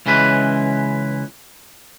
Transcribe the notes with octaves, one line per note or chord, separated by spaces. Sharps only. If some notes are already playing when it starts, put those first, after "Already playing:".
C#2 C#3 E3 G#3 B4